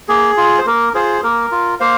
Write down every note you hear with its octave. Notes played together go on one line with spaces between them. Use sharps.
A#3 G#4
F4
C5
A#3 A#4
F4 G#4 C5
A#3 A#4
F4
A#3 C5 F5